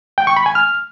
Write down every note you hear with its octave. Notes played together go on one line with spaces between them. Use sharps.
G5
C#6
B5
G#5
F6